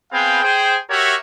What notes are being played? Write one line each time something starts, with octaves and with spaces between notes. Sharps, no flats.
B3 C4 G#4 B4 F5 G5
G#4 C5 G5
F#4 G4 A#4 C#5 E5